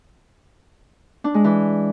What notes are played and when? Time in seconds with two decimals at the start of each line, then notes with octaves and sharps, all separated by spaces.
1.24 D4
1.34 G#3
1.44 E3